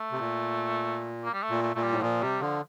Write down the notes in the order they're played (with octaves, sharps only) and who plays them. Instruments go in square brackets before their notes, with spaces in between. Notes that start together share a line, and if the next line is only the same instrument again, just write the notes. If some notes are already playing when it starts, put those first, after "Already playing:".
Already playing: [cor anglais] A3
[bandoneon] C3
A#2
[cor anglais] A#3
G3
A3
[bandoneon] A#2
[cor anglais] A3
[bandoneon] A#2 [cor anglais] A3
[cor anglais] G3
[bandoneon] A2
[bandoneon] A#2 [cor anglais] F3
[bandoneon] C3 [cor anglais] G3
[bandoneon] D3 [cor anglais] F3